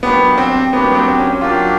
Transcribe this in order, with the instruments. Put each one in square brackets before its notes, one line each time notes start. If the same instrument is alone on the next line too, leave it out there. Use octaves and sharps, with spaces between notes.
[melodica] F#3 A#3 D4 G4 [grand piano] B3
[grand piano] C4
[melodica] F#3 A#3 D4 G4 [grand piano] B3
[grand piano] B3
C4
C#4
[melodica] F#3 A#3 D4 G4 [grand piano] F4